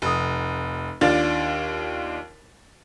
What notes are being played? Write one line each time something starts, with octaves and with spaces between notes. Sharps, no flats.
F1 D#6
D#2 D4 F4 A6